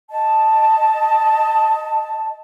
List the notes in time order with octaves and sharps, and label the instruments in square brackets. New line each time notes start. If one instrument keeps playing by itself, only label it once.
[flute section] D#5 A5